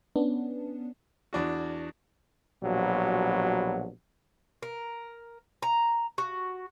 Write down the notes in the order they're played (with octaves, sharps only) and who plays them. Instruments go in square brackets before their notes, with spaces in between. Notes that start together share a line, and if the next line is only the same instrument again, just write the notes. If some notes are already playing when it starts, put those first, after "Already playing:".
[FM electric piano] B3 C#4 D4
[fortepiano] E2 D4 F#4
[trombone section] A#1 B2 F#3 G3
[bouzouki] A#4
A#5
F#4